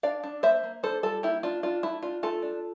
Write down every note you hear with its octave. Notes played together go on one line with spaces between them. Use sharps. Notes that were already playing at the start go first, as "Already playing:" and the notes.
D4 D5 F5
D4
A#3 C5 E5
A#3
D4 A4 C5
G3 F4 A4
A#3 E4 G4
D4 F4
D4 F4
A3 E4
D4 F4
A3 F4 A4
D4